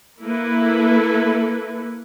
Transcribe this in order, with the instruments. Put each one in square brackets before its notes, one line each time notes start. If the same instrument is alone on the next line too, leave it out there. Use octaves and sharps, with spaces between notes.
[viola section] A#3 E4 A4 B4